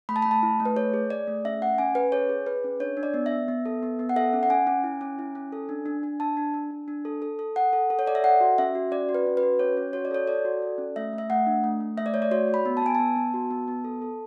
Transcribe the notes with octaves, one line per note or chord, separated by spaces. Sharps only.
A3 B5
A5
A3 B5
A5
E4
A3
B4
G#4 C#5
G#4
G#4 D5
A3
C#4 E5
C#4 F#5
C#4 G#5
C#4 B4
G#4 C#5
G#4
G#4 B4
C#4
D4 C#5
D4
D5
B3
E5
B3
B3
A4
B3
B3
F#5
A4 E5
C#4
F#5
C#4 G#5
C#4
E4
C#4
E4
C#4
A4
D4
D4
D4
D4 A5
D4
D4
D4
D4
A4
A4
A4
A4 F#5
A4
A4
C#5
A4 D5
E5
A4 F#5
F#4
C#4 E5
F#4
C#4 D5
F#4
B4
C#4
B4
F#4
C#4 C#5
C#4
F#4 C#5
D5
A4 C#5
A4 D5
F#4
A4
C#4
A3 E5
A3
E5
A3 F#5
D4
A3
A3
A3 E5
D5
A3 C#5
D5
F#4 C#5
F#4
B5
B3
A5
B3 G#5
B3 A5
B3
F#4
B3
B3
A4
A4